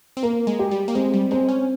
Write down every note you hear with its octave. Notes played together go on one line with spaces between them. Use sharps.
C4
A#3 A#4
G#3
G4
G3
A#3
G#3 C4
G3
G#3 C4
C#4